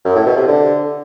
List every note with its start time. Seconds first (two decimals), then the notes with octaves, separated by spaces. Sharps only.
0.05 F#2
0.15 A2
0.26 B2
0.37 C3
0.47 D3